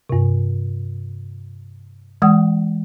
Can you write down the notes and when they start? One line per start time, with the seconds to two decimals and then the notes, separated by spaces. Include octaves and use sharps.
0.09 G2 C3
2.22 E3 G#3 F#5 D#6